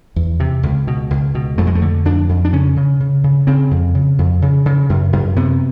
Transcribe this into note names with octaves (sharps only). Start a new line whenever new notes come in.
E2
C3
C#2
B2
C#2
B2
F2 A3
G#3
A3
D3
F2 D4
F2
D4
C#3 C#4
C#3
C#3
C#3
C#3 C4
F2
C#3
F2
C#3
C#3
F#2
F#2
C3 B3